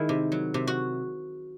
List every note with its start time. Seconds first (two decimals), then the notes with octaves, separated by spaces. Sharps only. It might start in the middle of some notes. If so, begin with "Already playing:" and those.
Already playing: D#3 G#3 E4
0.09 C3
0.32 F#3
0.54 C3
0.67 F#4